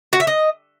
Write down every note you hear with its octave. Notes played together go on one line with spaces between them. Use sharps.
F#4
E5
D#5